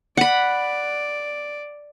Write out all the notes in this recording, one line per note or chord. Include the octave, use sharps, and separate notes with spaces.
D5 F#5 B5